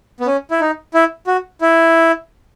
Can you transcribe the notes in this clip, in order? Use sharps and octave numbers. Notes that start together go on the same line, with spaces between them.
B3
C#4
E4
D#4
E4
F#4
E4